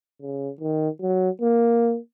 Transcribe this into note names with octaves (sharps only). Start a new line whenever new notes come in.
C#3
D#3
F#3
A#3